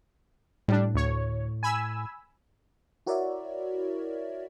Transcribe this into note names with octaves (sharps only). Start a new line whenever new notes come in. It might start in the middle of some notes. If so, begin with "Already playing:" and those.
A2 G3 D4
D2 C#5
G#5 B5 E6
E4 F#4 A#4 C#5 D5 E5